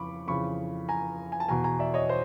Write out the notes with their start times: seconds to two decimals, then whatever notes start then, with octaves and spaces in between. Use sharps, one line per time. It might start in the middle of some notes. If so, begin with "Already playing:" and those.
Already playing: F2 C#3 E3 B5 C#6 D6
0.28 F2 C#3 E3 B5 C#6
0.89 G#5 A#5
1.32 G#5
1.40 A5
1.48 E2 B2 G#5 A#5
1.64 G#5 A#5
1.79 D5 E5
1.94 C#5 D#5
2.09 C5